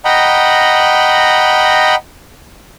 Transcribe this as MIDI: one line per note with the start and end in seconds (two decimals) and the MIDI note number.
0.05 1.95 75
0.05 1.95 78
0.05 1.95 79
0.05 1.95 82
0.05 1.95 83